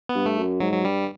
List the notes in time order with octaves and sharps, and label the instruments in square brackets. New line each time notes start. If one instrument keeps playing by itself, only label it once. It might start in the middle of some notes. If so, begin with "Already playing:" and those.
[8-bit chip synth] B3
[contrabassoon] G2
[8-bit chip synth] A3
[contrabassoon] F#2
[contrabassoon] G#2 [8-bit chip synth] F#3
[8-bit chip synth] F#3
[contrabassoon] G2 [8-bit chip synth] G3